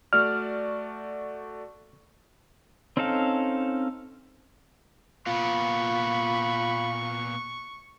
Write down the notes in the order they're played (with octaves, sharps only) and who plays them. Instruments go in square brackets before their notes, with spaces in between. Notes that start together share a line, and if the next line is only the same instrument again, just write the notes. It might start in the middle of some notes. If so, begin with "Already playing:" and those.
[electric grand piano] A3 F#4 D5 [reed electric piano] F6
[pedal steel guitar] C4 C#4 D#4 A4 F5
[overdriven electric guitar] A#2 B3 [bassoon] F4 [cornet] B5 [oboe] C#6